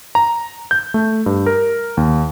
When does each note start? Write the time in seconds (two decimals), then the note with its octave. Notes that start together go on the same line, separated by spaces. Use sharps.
0.15 A#5
0.71 G6
0.94 A3
1.26 G2
1.46 A#4
1.97 D#2